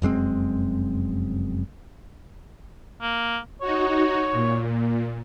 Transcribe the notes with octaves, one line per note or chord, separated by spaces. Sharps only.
F1 F#2 G#3 C4
A#3
D#4 F#4 C#5
A#2